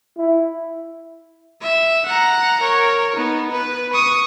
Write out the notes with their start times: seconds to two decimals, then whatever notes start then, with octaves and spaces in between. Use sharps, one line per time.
0.17 E4
1.62 E5
2.06 F#5 A#5
2.61 A#4 C#5
3.16 B3 D#4
3.52 B4
3.93 C#6 D#6